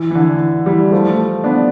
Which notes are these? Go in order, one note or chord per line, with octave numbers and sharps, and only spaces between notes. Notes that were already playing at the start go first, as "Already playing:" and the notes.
Already playing: E3
E3
D3
E3 G3
F3 A3
B3 D4